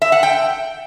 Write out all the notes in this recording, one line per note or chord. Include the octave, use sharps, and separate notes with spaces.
E5
F#5
G5